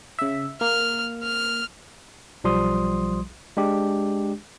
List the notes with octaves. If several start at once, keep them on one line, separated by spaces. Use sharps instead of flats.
C#3 E5
A#3 F6
F6
B1 F3 G3 C6 D#6
G#3 D4 G4